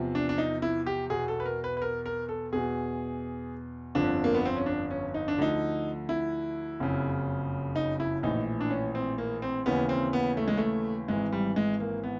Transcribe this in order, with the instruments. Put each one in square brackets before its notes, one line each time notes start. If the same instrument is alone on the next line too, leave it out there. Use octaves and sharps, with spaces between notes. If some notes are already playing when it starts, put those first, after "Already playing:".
Already playing: [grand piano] E2 C3 F3
D4
D4
D#4
E4
G4
E2 B2 G#4
A4
B4
A#4
B4
B4
A#4
A#4
A4
E2 B2 G#4
G1 F2 D3 F3 D4
A#3
B3
C4
C#4
D4
C#4
D#4
D4
D2 D3 F3 D#4
E4
F#1 F2 C#3
D#4
E4
A#1 A2 E3 D#4
D4
C#4
C4
A#3
C4
D#2 C#3 E3 B3
C4
B3
A3
G#3
A3
G#1 G#2 E3 G#3
G3
G#3
A#3
B3